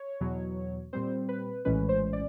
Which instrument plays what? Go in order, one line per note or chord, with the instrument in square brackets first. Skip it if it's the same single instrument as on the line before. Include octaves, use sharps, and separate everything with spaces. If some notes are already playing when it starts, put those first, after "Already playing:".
Already playing: [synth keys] C#5
E2 B2 F#3
A#2 G3 C4 C5
B4
A#1 A2 E3 G#3 C#4 B4
C5
D5